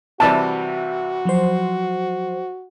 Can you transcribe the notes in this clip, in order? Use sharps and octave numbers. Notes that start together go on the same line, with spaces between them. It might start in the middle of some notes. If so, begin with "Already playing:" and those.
C3 E3 G3 F#4 E5 A5
F3 F#3 C5